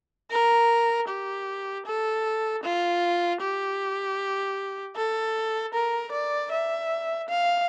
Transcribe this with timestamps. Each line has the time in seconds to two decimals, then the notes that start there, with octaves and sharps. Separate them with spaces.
0.31 A#4
1.08 G4
1.86 A4
2.63 F4
3.41 G4
4.96 A4
5.74 A#4
6.12 D5
6.52 E5
7.29 F5